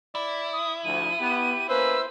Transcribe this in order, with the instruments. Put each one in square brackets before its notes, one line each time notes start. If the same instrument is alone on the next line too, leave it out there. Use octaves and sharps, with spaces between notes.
[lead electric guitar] E4 [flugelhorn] D5
[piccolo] D#6
[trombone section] D2 [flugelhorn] F3 [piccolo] D#7
[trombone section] B3 [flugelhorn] G4
[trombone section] A#3 C#4 B4 [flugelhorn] C5 [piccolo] E6